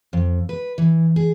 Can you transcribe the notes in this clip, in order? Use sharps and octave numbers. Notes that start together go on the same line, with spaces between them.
F2
B4
E3
G#4